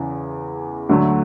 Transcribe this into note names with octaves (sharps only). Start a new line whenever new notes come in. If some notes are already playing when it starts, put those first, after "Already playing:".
Already playing: E2 C#3 E3
D2 D3 F#3 A3